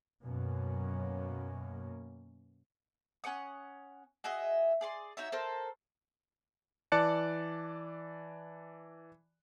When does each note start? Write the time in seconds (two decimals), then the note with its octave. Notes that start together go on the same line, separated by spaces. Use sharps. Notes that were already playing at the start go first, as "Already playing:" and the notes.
0.22 F#2 B2 A#3 C#4
3.24 C#4 F#5 C#6 D#6
4.24 F#4 G#4 D#5 E5
4.81 G#4 D5 C6
5.17 D#4 F#4 C#5 E5
5.32 A4 A#4 C5
6.92 E3 D5 A5 F#6 C#7